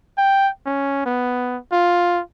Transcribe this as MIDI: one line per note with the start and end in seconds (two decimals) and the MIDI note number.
0.18 0.49 79
0.66 1.05 61
1.06 1.58 59
1.72 2.21 65